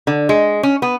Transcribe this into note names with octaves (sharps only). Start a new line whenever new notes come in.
D3
G#3
C#4
B3